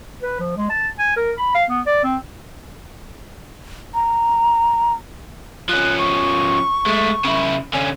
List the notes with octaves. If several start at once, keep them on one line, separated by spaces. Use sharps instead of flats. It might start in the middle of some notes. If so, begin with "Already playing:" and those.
B4
F3
G#3
A5
G#5
A#4
B5
F5
B3
D5
C4
A#5
F3 C#4 F#6
C#6
G#3 A3
C#3 E4
D3 C#4 G#5